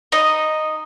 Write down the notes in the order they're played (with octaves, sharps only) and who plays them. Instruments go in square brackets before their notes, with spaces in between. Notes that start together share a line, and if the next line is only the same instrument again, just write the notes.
[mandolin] D#4 D#5